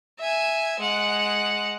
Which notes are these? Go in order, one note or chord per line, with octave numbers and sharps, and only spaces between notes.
E5 G#5
G#3 F#5